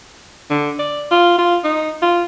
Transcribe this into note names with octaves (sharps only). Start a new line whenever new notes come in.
D3
D5
F4
F4
D#4
F4